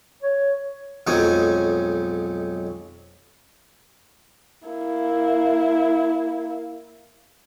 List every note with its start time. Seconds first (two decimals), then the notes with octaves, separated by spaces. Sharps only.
0.22 C#5
1.07 B1 F2 F#3 G#3 D#4 G#5
4.68 A#3 E4